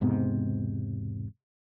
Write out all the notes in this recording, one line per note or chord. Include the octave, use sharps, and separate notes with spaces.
E1 G#2 C3 B3